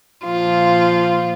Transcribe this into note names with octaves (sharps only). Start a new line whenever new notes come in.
A#2 F3 F4